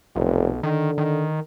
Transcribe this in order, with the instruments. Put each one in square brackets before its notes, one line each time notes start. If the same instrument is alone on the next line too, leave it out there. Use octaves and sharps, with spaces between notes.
[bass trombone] F1 [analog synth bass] B1
[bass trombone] D3 [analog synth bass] D#3
[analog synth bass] D#3